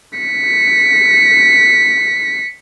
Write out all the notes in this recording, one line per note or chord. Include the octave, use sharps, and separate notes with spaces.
B6 C#7